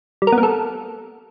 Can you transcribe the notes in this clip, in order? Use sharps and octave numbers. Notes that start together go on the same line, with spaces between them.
G3
A#4
B3
A#3
A4